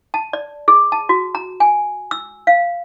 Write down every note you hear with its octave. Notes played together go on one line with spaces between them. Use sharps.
A5
D5
G#4
A5
F#4
A#5
G#5
E6
F5